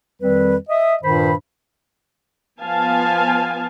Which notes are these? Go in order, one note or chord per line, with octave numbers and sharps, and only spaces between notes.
F2 D#3 G3 C4 B4
D#5 E5
G2 A#2 D#3 C5 B5
F3 B3 F5 G#5 A5